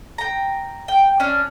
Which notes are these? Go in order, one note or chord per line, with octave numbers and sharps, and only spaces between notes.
G5 A#5
G5
C#4 D4